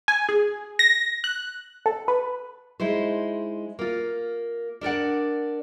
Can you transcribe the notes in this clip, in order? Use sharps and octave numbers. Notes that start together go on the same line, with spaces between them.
G#5
G#4
A#6
F#6
A4
B4
G#3 D#4 E4 C5
A#3 F4
D4 A#4 D5 F#5